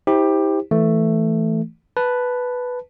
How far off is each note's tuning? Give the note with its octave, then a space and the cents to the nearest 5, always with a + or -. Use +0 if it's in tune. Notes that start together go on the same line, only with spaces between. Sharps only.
E4 -40 G4 +15 C5 +5
E3 +0 A3 +5
B4 +0 A5 +0